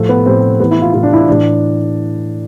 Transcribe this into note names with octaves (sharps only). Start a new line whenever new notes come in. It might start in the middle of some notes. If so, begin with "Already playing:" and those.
Already playing: A2 F3 A3
B3
A2 F3 C4
A2 E3 B3
E4
F4
A2 E3 E4
D4
E4
A2 E3 D4